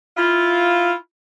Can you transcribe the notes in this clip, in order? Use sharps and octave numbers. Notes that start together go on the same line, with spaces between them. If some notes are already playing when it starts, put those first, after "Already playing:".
E4 F4